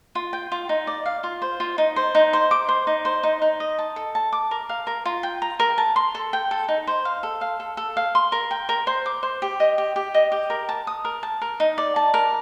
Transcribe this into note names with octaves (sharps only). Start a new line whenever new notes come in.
F4
G5
F4
D#4
D5
F5
F4
C5
F4
D#4
C5
D#4
C5
D6
C5
D#4
C5
D#4
D#4
D#5
A5
A4
A5
D6
A#4
F5
A#4
F4
G5
A#5
A#4
A5
C6
A4
G5
A4
D#4
C5
F5
A4
F5
A4
A4
F5
C6
A#4
G5
A#4
C5
D6
C5
G4
D#5
G4
G4
D#5
G4
A#4
A5
D#6
A#4
A5
A#4
D#4
D5
A5
A#4